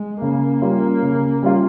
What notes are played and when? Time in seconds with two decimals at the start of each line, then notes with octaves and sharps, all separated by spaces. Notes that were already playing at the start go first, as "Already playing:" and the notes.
Already playing: G#3
0.21 C#3 A#3
0.62 G3 C#4 F4
1.02 C#3
1.43 G3 C#4 F4